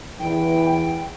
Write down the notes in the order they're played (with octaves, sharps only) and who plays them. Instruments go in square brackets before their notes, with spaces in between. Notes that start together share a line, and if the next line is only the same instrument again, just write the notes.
[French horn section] E2 E3 [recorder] G5